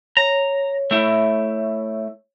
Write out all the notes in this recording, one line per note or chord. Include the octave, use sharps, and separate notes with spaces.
C#5 A#5
A3 E4